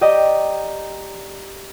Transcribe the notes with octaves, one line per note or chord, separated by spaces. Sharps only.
G4 D5 D#5 G5 A#5